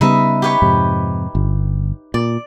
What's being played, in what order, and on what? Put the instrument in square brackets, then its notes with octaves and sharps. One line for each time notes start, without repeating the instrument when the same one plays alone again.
[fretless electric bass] C#3 G3 B3 [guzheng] D#4 B4 E5
[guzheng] G4 B4 C#5
[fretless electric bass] F2 G#2 C3
G1
[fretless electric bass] A#2 [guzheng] D5